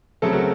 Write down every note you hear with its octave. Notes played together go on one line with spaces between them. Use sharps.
C#3 F#3 A3 C4 A4
F#4 A#4